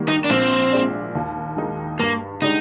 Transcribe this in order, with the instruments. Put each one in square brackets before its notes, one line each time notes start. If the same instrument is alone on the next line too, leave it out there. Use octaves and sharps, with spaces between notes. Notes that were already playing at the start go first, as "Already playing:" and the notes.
Already playing: [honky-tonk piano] G#2 D#3 G3 A#3
[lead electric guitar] D#4
D4
[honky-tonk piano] A#1 [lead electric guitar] C4
[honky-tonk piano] A#2 G#3 D4
D#2
D#3 G#3 D#4
[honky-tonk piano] G2 [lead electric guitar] A#3
[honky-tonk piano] D3 G#3 D4 G4 [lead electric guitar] D#4